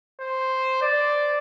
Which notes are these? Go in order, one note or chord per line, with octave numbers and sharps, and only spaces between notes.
C5
D5